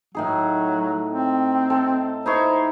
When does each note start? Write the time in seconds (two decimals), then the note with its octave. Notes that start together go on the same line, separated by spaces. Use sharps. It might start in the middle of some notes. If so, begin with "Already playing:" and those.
0.15 A2 F#3 D#4 G#4
1.09 C4
1.70 A4
2.26 D#4 E4 C5 C#5